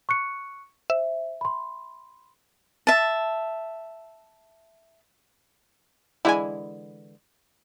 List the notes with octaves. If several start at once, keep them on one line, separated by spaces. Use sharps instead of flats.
C#6 F#6 C#7
C5 E5
B5 C6
E5 A5
D3 E3 G#3 E4 G#5